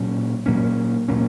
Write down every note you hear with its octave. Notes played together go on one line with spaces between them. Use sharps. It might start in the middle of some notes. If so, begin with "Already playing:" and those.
Already playing: A#2 F#3 A#3 C#4
A#2 F#3 A#3 C#4
A#2 F#3 A#3 C#4